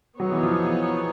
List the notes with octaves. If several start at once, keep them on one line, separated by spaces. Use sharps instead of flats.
F#3 B3 D#4 G#4 C#5
E3
F3